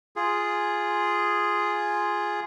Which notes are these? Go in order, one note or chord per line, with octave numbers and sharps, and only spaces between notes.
F4 G#4